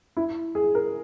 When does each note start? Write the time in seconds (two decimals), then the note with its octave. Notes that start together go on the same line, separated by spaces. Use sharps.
0.17 E4
0.55 G#4
0.75 A#4